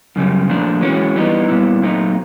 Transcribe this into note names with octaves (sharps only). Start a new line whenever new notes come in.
F#2 C#3 G3
A#2 F3 A3 D4
E3 G#3 C#4 F#4
E3 G3 B3 D#4
A#2 G3 B3 E4
A#2 F#3 A3 C4 D#4